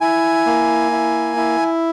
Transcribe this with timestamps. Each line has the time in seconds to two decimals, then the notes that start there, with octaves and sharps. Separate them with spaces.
0.01 E4 G#5
0.46 A#3
0.92 E4
1.37 E4